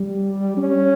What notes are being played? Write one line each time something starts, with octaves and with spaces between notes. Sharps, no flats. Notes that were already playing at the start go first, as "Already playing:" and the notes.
Already playing: G3
C#4